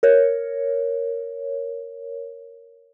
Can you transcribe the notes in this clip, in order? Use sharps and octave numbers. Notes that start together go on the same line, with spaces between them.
A#4 C#5